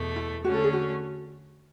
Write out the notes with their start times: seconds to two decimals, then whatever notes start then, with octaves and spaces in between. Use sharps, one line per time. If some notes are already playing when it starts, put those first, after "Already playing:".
Already playing: E2 B2 A3
0.16 E4
0.44 D3 A3 C#4 F#4
0.54 A4
0.64 G#4
0.73 F#4